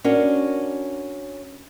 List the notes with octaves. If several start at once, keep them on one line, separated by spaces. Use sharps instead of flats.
C#4 D4 F#4 A#4 C#5